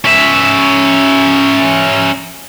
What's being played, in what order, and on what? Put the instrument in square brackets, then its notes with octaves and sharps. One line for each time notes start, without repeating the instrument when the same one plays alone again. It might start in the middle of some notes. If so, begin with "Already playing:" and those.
[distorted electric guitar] C#4 E5